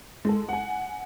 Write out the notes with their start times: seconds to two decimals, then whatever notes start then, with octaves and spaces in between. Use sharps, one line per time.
0.25 G#3 A4
0.49 F#5 G#5